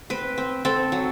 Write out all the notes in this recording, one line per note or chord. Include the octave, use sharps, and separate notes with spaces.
C4 B4
C4
C4 A4
F#3